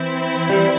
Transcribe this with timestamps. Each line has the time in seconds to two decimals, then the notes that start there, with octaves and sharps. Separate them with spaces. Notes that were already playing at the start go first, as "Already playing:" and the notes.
Already playing: E3 C4 E4
0.49 G3